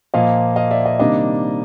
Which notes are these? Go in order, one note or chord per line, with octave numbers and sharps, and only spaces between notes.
A#2 F3 A#3 D#5 F5
D#5 F5
D5 E5
D#5
C3 D#3 G3 A#3 D4 D#5